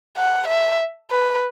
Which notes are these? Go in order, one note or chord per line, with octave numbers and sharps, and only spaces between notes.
F#5
E5
B4